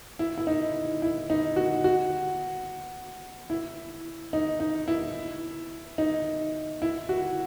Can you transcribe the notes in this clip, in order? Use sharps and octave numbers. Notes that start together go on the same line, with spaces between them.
E4
E4
D#4
E4
D#4
F#4
F#4
E4
D#4
D#4
E4
D#4
E4
F#4